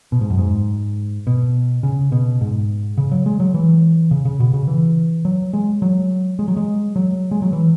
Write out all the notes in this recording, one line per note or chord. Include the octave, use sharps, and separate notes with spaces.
B2
G#2
F#2
G#2
B2
C#3
B2
G#2
C#3
F#3
G#3
F#3
E3
C#3
C#3
B2
C#3
E3
F#3
G#3
F#3
G#3
F#3
G#3
F#3
G#3
F#3
E3